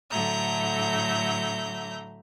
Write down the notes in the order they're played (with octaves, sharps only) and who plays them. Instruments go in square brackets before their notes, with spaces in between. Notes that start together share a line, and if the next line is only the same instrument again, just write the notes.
[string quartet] A2 D3 F#3 E5 A#5 G6